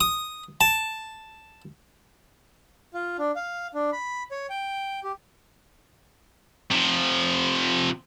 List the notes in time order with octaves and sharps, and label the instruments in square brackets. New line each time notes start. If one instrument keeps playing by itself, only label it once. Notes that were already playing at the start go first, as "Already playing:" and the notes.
[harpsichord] D#6
A5
[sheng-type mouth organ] F4
D4
F5
D4
B5
C#5
G5
G4
[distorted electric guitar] C3 F3